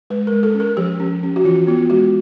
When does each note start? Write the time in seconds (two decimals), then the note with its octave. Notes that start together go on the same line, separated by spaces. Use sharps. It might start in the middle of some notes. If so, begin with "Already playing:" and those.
0.10 G#3 B4
0.27 A#4
0.32 G#3
0.43 A4
0.55 C#4
0.60 A#4
0.77 F3 G4
1.00 C#4
1.23 C#4
1.36 F#4
1.45 E3 F4
1.67 B3 F4
1.90 G#3 F#4